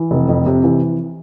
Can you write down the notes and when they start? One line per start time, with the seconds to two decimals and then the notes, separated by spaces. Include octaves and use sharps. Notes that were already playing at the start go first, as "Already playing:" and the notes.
Already playing: E3
0.11 F1
0.29 F2
0.46 C3
0.64 E3